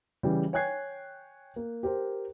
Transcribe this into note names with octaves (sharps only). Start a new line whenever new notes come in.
C#3 E3 G3
C#5 G5 G#5 F#6 G#6 C7
A#3
G4 A#4 C5